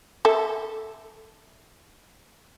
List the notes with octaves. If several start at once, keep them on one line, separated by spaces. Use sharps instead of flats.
A4 E5